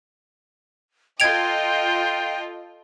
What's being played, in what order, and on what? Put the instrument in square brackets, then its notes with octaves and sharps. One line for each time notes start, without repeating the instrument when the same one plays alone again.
[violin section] F4 A4 D#5 [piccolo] G5 [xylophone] G#6 D7 F7